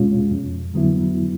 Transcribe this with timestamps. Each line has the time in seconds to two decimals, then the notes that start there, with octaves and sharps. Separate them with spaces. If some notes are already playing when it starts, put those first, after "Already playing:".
Already playing: E2 B2 G#3 C#4 F4
0.31 F2
0.74 D3 F#3 B3 E4